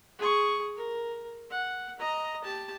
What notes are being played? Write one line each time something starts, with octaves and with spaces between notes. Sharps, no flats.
G#4 C#6
A#4
F#5
D#5 A#5
G4 A5